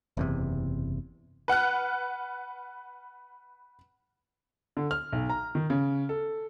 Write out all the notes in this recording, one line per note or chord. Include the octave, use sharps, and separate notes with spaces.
F#1 E2 C3
B4 F#5 F6 F#6
D3
F6
B1
A#5
D#3
C#3
A4